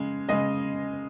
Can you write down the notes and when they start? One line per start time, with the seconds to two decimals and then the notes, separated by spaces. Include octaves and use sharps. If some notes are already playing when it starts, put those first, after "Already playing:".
Already playing: C#3 G#3
0.29 C#3 G#3 D#5